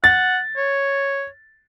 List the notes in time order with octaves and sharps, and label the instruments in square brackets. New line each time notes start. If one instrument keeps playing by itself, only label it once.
[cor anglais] F#5 [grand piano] A6
[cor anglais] C#5